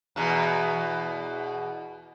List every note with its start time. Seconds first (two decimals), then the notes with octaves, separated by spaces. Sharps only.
0.16 E2 B2